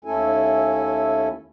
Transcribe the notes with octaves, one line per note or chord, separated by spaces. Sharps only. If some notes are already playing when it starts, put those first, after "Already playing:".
D#2 A3 C#4 E4 A4 G#5